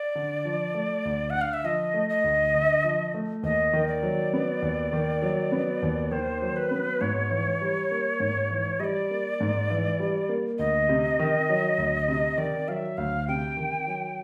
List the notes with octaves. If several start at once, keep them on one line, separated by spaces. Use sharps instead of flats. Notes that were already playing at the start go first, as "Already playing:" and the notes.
Already playing: D5
D3
F3
A3
D2
D3 F#5
F5
E5
F3 D#5
A3
D#5
D2
D3
F3
A3
D#2 D#5
D#3
D5
F#3
B3
D#2
D#3
F#3
B3
D#2
D#3 C5
F#3
B4
B3
G#2 C#5
E3
G3
A#3
G#2
E3
G3 D5 D#5
A#3
G#2
E3
G3
A#3
D2 D#5
C3
D#3
F#3
D2
C3
D#3 D5
F#3 E5 F5
D2 F5
C3 G5
D#3
F#3